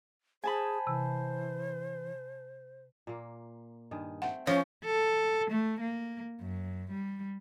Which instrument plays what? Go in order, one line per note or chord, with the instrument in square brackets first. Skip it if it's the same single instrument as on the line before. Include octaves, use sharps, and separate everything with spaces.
[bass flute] G#4 [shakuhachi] C5 [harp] G#5 A5 B5
[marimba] C3 [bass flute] E3
[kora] A#2 A#3
G2 D#3 G#4
[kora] A3 C4 G5 [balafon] F#5
[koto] F3 [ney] C#4 [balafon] C#5 [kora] F5
[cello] A4
A3
A#3
F#2
G3